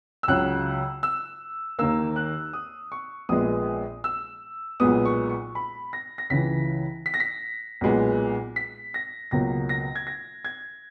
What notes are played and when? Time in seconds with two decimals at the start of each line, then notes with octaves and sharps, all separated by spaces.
0.23 E6
0.28 C#2 C#3 F#3 F#6
1.03 E6
1.79 D#2 D#3 A#3 E6
2.16 F#6
2.53 D#6
2.92 C#6
3.29 A#1 A#2 G#3 B3 D#6
4.04 E6
4.80 B1 A#2 G#3 B3 D#6
5.06 C#6
5.29 C#6
5.55 B5
5.93 A#6
6.18 A#6
6.30 C#2 C#3 E3 B6
7.06 B6
7.14 A#6
7.20 B6
7.81 B1 A#2 G#3 B3
8.56 B6
8.94 A#6
9.31 C#2 B2 F#3 A#3 A#6
9.69 A#6
9.96 G#6
10.07 A#6
10.45 G#6